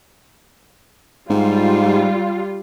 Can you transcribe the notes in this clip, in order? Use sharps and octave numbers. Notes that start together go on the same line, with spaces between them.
G#2 G3 F4